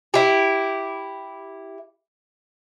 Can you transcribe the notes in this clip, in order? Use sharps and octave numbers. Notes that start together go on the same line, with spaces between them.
E4 G4